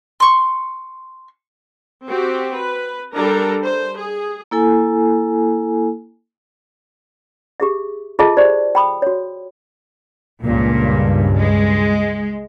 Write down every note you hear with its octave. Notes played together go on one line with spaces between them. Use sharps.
C6 C#6
C4 F#4 G4
B4
G3 D4 A4 A#4 A#5
C5
G#4
A#3 E4 A4 G#5
G4 G#4 E5
F4 G#4 A4 D#5 E5 A5
G4 C5 D5
G5 B5 D#6
F#4 C#5
C#2 G2 A#2
G#3